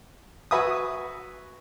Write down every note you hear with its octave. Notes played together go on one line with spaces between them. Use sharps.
F#4 B4 E5 G#5 D#6